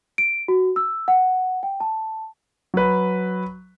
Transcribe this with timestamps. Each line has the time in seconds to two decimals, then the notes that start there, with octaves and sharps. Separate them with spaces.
0.18 D7
0.48 F#4
0.76 E6
1.08 F#5
1.63 G5
1.80 A5
2.74 F#3 B4